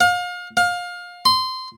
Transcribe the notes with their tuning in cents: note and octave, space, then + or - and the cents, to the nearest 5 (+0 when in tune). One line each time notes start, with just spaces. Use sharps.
F5 +35
F5 +25
C6 -20